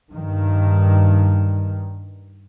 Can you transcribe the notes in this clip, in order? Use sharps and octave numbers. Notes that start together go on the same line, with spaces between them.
G2 D#3